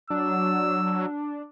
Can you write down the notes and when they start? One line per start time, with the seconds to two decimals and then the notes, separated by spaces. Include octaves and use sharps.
0.10 F#3 D4 E6